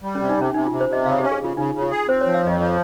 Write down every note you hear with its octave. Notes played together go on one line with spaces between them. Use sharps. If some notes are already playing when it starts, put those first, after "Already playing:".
G3
C#4
C3
D#4
C3 C#4
C3 D#4
F4
C3
C5
C3 D#5
C#3 F5
G4
C#4
G#4
C#3 F4
C#3 D#4
C#3
F4
G#4
C4 C5
C#5
F3
F5
F2 D#5
F3